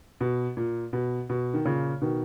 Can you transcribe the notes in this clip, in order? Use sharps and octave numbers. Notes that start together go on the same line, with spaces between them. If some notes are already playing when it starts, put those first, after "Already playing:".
B2
A#2
B2
B2
D#3
A#2 C#3
B2 D#3